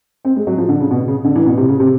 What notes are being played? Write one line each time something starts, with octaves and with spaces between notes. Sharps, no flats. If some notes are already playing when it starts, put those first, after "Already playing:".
C4
G#3
F#3
F3
D3
C#3
B2
C#3
D3
E3
B2
C3
C#3
C3